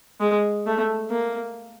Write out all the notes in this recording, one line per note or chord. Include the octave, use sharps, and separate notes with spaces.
G#3
A3
A#3